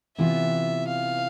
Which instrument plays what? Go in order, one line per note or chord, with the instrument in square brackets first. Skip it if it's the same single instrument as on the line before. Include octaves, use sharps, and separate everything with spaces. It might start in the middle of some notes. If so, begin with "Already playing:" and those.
[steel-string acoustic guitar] C3 E3 B3 F4 [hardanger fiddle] E5
[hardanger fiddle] F5